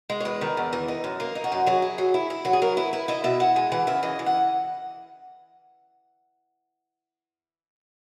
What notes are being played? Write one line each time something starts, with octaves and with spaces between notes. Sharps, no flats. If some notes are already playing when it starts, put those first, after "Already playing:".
G#3
C#5
E2 B4
D#3
E2
E3
D#4
F#2
A#3 A#4
D#4
F#4
F#2
F#3 G#4
E4
F#3
E4
E4
F#3 F#4
G#4
F#3 A#4
E4 B4
E4 B4
E4 D#5
B2 E5
E4 F#5
G#3 G#5
E3 F#5
C#3 E5
E3 D#5
E3
F#5